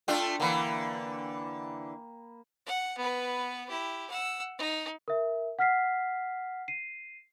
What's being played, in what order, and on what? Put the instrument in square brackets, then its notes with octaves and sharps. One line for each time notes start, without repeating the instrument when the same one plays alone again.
[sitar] A3 D4 F4 [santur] A4 G5
[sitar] D3 E3 [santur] A#3 B5
[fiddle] F#5
B3 B4
E4 G4
F#5 E6
D#4
[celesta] A#4 E5
F#5 F6 B6 C7
C7 D#7